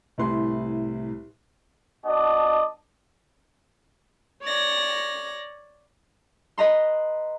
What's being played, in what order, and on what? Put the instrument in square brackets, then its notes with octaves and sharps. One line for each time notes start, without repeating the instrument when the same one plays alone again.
[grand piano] C2 A2 B4 C6
[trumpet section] B3 D4 F#4 D5 D#5 A5
[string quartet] C#5 D5 A#6
[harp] B4 D#5 A#5 C6